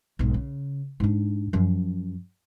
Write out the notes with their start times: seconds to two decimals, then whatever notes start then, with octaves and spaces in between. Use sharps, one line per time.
0.19 B1 G#2
0.34 C#3
1.00 G#2 D4
1.53 F#2 F3